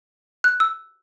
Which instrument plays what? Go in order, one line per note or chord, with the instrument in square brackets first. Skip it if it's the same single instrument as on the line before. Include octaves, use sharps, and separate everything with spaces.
[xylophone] F#6
E6